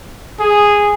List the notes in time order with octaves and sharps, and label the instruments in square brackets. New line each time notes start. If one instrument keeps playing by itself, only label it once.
[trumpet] G#4